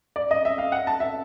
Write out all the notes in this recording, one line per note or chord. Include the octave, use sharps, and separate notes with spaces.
D5
D#5
E5
F5
F#5
A5
E5